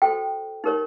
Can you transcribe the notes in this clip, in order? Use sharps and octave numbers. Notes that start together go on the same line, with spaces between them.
F#4 A4 C5 G5
D#4 G4 A#4 C#5